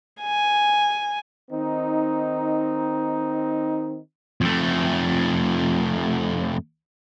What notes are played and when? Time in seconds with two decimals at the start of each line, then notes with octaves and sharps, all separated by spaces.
0.21 G#5
1.51 D#3 C4 D#4
4.41 F2 A3